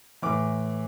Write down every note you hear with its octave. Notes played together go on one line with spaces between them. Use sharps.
A2 E3 D6